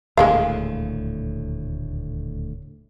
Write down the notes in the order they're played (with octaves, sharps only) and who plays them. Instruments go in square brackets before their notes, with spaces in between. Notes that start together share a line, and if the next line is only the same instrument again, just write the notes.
[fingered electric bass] D#1 D2 A2 [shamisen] G#3 A#3 F5